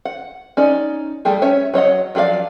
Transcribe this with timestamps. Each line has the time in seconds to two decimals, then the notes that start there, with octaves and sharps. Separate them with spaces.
0.05 F#5
0.57 C#4 D#4 D5
1.25 G3 A3 G4 G#4
1.42 C#4 C#5 E5 G#5
1.74 F#3 C#5 D#5 F#5
2.15 F3 F#3 G#4 D5 F5